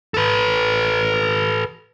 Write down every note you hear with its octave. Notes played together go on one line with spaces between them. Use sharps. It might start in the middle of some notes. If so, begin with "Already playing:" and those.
A4 B4